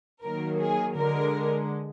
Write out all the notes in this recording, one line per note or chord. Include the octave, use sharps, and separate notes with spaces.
D#3 F#3 A#3 A#4
G#4
D3 G#3 A#4